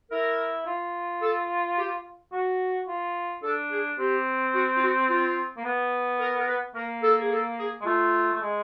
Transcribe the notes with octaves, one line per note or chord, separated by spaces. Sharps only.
E4 A#4
F4
A4
G4
F#4
F4
D4 A4
G#4
C4 G4
F#4
F4
F#4
F4
A#3
B3
A#4
A#4
B4
A#3 A#4
A4
G#4
A4
G#4
G#3
A3 F4
A3
G#3